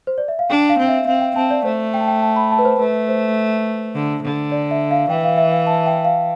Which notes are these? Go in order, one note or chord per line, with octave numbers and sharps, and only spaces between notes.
C5
D5
E5
F5
D4 G5
F5
C4
E5
C4 F5
G5
C4 A5
D5
A3 C5
G5
A5
G5
A5
B5
A5
B4
C5
A3 B4
C5
D3
D3
D5
E5
F5
E3 G5
F5
E5
F5
A5
G5
F5